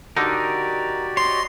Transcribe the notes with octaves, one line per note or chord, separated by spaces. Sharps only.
D3 D#4 F#4 G4 A#4 D5 D#5
C#5 D#5 C6